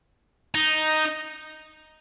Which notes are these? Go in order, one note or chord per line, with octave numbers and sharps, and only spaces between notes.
D#4